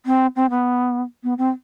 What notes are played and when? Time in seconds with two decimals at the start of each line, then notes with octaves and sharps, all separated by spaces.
0.06 C4
0.36 C4
0.50 B3
1.23 B3
1.38 C4